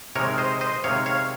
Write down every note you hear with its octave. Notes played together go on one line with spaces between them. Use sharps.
C3 D#3 G#3 A#4 C#5
C5 D#5
C5 D#5
C3 D#3 G#3 C#5 F5
C#5 F5